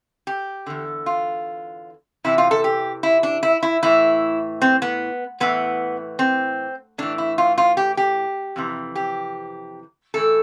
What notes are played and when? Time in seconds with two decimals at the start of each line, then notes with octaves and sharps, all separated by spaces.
0.27 G4
0.67 E2 D3
1.06 F4
2.24 E2 C3 E3 E4
2.38 F4
2.51 A4
2.64 G4
3.03 E4
3.23 D4
3.43 E4
3.63 E4
3.83 A2 E3 E4
4.62 C4
4.82 B3
5.40 A2 E3 B3
6.19 C4
6.98 A2 E3 D4
7.18 E4
7.38 F4
7.58 F4
7.77 G4
7.97 G4
8.56 F2 C3 E3
8.96 G4
10.14 A2 E3 A4